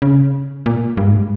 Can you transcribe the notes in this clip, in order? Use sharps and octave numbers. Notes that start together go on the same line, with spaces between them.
C#3
A#2
G2
G#2